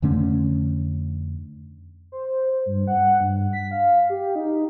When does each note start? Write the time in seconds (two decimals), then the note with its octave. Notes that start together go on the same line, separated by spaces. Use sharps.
0.02 F2 D3 A3 C#4
2.12 C5
2.66 G2
2.87 F#5
3.21 G2
3.53 B6
3.71 F5
4.10 G4
4.35 D#4